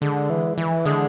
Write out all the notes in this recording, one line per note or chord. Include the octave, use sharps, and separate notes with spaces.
D3 G#3
E3
E3
D3 G#3